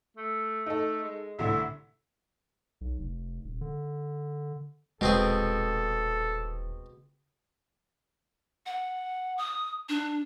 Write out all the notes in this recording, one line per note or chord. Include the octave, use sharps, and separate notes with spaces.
A3
A3 D#4 A4
G#3
C2 A2 D3 E5
B1
F1
D#1
D3
D#1 B2 G#3 C4 G#4 A4
F#5
D#6
D4